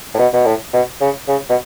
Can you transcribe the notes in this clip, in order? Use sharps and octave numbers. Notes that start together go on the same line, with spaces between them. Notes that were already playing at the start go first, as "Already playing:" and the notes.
A2
B2
B2
A2
B2
C#3
C#3
B2